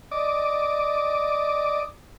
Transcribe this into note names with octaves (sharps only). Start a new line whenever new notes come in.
D5 D#5 D6